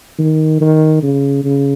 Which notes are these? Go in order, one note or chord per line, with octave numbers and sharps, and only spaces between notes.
D#3
D#3
C#3
C#3